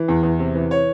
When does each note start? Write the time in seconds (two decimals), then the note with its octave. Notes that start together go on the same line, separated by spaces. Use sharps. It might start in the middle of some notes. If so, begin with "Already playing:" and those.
Already playing: E3
0.08 E2
0.23 E2
0.39 C3
0.55 E3
0.71 C#5